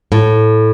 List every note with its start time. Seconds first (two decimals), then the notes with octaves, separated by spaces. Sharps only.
0.12 A2